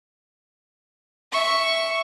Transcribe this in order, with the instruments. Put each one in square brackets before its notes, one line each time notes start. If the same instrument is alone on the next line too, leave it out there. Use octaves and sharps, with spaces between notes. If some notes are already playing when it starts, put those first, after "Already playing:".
[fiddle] E5 [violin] C#6